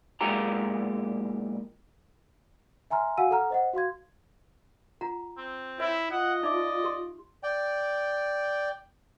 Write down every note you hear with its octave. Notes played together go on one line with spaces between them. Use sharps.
B1 A#2 G#3 A#3 G4 A#5
E5 G#5 A#5 C6 F6
F#4 F5 F#5 G#5 E6 D#7
A4 F#5 A#5 F6
C5 D#5 F#5
F#4 F5 C6 G#6
F4 F#5 A#5
C4
E4 C#5 E5
F4 D#5 F#5
D#4 D5 E5 D6
G4 C6
D5 G5